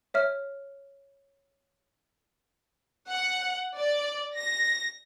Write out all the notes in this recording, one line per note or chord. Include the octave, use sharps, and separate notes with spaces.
C#5 E5 F6
F#5
D5
A#6